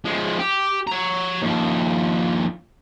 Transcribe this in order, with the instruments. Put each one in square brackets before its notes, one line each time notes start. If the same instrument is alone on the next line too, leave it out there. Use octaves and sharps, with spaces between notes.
[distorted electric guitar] F3 G#3
G4
C#5 A#5
D#2 F3